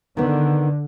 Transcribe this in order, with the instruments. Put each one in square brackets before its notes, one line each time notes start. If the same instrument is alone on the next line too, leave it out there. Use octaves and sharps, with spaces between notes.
[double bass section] D3 [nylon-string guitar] D#3 B3